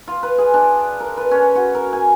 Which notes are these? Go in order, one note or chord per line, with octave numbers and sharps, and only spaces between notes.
F4
B4
G#4
D4
A#4
B4
C#4
F#4
A#4
G#5